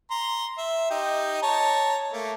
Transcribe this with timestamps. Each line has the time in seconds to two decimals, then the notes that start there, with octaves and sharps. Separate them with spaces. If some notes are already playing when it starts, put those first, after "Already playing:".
0.11 A#5 C6
0.58 E5
0.90 D#4 G4
1.42 C#5 A5 A#5
2.13 A3 A#3